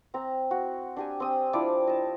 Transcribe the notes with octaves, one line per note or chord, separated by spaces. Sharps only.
C4 A#5
F#4
D4 G4 G#5
C4 D#6
F3 D4 E4 D5
D#5 A5